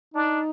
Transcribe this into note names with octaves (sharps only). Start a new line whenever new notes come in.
D4 D#4